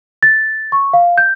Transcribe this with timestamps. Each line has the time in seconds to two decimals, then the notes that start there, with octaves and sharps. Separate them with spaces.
0.23 A6
0.72 C#6
0.93 F5
1.17 G6